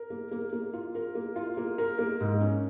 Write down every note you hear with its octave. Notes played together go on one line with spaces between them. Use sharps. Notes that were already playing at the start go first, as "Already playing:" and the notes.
Already playing: A#4
A#3
A#3
A#3
F4
A#4
A#3
F4
A#3
A#4
A#3
G#2
C#4